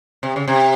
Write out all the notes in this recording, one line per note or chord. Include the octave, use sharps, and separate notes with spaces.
C3
C#3
C3